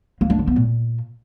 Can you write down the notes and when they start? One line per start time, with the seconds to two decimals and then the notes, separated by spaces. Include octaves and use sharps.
0.21 A#3
0.30 D4
0.39 D3
0.47 B3
0.56 A#2